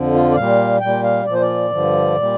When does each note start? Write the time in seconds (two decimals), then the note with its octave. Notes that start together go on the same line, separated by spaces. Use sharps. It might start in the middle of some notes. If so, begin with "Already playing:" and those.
Already playing: F2 D3 F3
0.14 F4
0.31 D5
0.36 A#2 G3 F5
0.80 A#2 G3 G5
1.03 F5
1.25 A#2 F3 D5
1.34 C5
1.41 D5
1.70 G2 D3 F3
2.15 A#2 G3